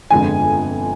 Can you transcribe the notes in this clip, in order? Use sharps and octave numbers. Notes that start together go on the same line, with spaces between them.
G1 F2 D3 G#3 G#5